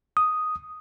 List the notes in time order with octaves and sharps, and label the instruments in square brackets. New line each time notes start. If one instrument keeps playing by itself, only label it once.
[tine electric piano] D#6